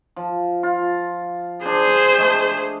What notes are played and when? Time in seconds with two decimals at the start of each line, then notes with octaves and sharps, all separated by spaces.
0.16 F3
0.63 F4
1.65 D4 G#4 C5
2.18 G#3 A3